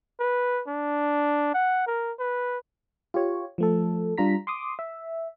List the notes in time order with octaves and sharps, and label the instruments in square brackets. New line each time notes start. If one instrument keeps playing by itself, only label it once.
[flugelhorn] B4
D4
F#5
A#4
B4
[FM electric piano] F4 G4 C#5
F3 A3 A4
G3 D4 F4 A#5 B6
C6 D6 D#6
E5